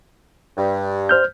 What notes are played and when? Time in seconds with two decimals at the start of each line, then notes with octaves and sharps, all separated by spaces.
0.57 G2
1.09 C5 F6 G6